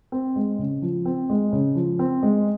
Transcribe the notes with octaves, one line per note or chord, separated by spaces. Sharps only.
C4
G#3
C#3
F3
C4
G#3
C#3
F3
C4
G#3